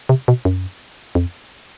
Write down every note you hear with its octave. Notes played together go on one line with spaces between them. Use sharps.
C3
B2
F#2
F2